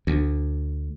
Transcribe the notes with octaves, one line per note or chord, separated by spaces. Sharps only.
D2